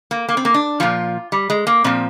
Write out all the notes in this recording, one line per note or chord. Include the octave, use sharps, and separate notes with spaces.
A#3
A#3
C4
A#3
D4
A#2 F3 F4
G3
G#3
A#3
A#2 F3 C4